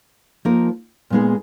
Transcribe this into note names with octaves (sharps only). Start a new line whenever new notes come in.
F3 A#3 D#4 A#4
A#2 G#3 B3 D#4 G#4